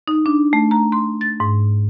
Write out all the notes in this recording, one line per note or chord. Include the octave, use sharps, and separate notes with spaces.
D#4
D4
A3
A#5
C6
A6
G#2